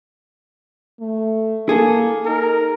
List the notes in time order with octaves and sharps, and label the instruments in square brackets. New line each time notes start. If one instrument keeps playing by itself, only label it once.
[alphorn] A3
[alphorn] A#3 [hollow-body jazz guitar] G#4 A4
[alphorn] D#4 [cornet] A#4